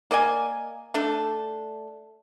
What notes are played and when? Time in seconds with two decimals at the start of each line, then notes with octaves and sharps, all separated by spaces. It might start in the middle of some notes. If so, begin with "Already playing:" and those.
0.11 A#3 D5 D#5 G#5
0.94 A3 D4 A4